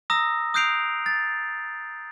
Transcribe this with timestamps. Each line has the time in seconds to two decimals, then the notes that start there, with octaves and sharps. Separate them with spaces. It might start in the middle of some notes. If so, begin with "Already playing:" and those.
0.10 A#5 D#6 E6 A#6
0.54 D#6 F#6 G6 C7 D7 F7
1.06 A6